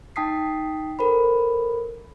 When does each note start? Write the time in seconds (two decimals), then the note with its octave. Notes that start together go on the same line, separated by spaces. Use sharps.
0.16 D#4 G5 A5 D#6 B6 C7
0.99 A4 A#4 C5 B5